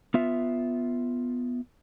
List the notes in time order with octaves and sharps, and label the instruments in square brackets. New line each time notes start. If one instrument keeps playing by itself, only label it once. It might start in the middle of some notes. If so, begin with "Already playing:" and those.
[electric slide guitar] B3 F4 E5